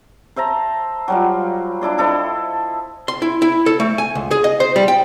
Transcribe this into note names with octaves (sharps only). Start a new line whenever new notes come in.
C5 E5 A5 A#5
F#3 G3 F4
D4 E4 D5 C6
E4 A4 C5 D#5
C6
E4
E4
A4
A3
G#5
C#2
G#4
D#5
C5
G3
G5